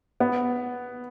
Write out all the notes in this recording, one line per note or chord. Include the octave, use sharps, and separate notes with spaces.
B3